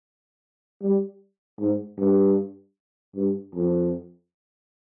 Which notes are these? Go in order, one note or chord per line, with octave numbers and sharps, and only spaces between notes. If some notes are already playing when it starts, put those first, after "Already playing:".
G3
G#2
G2
G2
F2